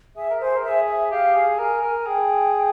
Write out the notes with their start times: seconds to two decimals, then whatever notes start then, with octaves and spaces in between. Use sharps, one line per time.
0.16 G#4 E5
0.30 A#4
0.40 G#4 C5
0.56 A#4
0.64 G#4 E5
0.87 E5
1.11 G4 F5
1.35 G#4
1.59 A#4 G#5
1.82 A#4
2.06 G#4 G5